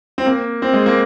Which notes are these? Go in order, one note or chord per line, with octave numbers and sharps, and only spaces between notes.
C4
A#3
C4
G#3
A#3